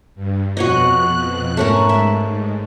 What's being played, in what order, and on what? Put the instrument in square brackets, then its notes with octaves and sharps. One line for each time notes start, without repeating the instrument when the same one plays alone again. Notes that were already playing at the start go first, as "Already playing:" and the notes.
[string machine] G2
[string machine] F2 B2 F#6 [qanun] F#4 C#5 D#5
[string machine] G#2 [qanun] A3 C#4 A#4
[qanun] E5